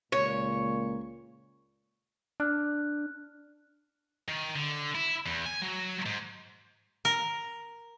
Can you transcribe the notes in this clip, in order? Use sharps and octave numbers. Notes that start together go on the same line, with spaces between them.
C#2 A#2 C#5
D4 F6 F#6
D#3
D3
E4
E2
G#5
F#3
G#2
A#4